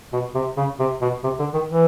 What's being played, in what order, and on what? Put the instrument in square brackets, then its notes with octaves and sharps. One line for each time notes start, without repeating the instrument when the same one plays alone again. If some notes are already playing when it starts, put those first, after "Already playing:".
[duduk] B2
C3
C#3
C3
B2
C3
D3
D#3
E3